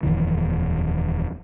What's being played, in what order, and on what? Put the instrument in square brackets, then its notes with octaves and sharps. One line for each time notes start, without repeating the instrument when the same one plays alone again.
[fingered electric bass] D#1 F2 D#3 E3